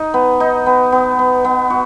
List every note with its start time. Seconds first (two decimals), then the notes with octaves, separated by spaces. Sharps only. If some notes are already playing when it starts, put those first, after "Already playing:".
Already playing: D#4
0.14 B3
0.40 D#4
0.66 B3
0.92 B3
1.19 B3
1.45 B3
1.70 F#4